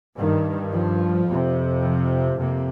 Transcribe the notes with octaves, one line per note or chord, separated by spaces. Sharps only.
G2 D#3
F3
F2 C3
F3
F2 C3 A#3